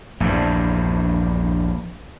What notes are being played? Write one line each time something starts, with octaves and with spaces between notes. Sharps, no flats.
A#1 E2 G2